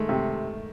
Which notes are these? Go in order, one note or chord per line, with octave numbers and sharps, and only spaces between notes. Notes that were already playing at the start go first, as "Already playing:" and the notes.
Already playing: D#3 G#3 A3
C3